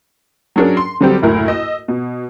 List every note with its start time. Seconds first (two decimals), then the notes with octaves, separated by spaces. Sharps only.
0.56 F#3 C#4 D4 G#4 A#4
0.77 C6
1.01 D3 F#3 G3 C4 G4
1.22 F#1 D2 A2 E4 A#4
1.48 D#5 E6
1.88 B2